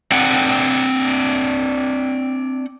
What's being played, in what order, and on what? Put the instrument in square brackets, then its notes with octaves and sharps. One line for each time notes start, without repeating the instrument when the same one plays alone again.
[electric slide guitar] C4 D4 F#5 G5